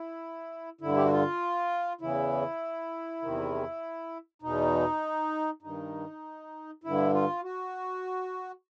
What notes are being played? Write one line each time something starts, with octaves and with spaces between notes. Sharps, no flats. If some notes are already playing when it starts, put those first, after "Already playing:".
Already playing: E4
G2 D3 E4
G4
F#4
F4
E2 C#3 E3 E4
E2 C3 D#3
E2 B2 D#4
G2 D#3 D#4
G2 D3 E4
F4
F#4